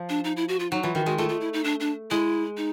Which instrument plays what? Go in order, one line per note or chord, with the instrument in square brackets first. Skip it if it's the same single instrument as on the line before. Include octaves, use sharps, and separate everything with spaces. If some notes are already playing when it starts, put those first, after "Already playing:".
Already playing: [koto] F3
[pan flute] D4
D#4
E4
F#4
F4
[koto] F#3 [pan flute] D#4
[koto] E3 [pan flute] F4
[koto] D#3 [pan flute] F#4
[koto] G#3 [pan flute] F#4
[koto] A3 [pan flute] F4
[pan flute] F4
E4
D#4
D4
D4
[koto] G#3 [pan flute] E4
[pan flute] D#4